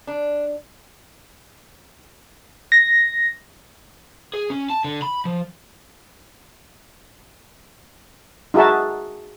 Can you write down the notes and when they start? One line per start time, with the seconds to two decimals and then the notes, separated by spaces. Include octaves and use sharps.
0.07 D4
2.72 A#6
4.34 G#4
4.50 C#4
4.70 A5
4.84 D3
5.02 B5
5.25 F3
8.54 D#4 F#4 G#4 E5 A5